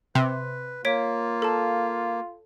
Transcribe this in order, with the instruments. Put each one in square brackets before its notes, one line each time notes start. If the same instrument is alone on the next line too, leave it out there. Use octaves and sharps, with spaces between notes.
[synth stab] C3 [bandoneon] B4 [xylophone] C6
[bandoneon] A#3 [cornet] F4 [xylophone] C#5 B6 D7
[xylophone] A4 A5